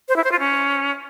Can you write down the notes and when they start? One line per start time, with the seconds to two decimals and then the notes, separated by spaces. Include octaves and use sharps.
0.08 C5
0.16 E4
0.24 C5
0.32 F4
0.39 C#4